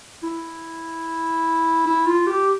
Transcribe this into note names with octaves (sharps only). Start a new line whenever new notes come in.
E4
E4
F4
G4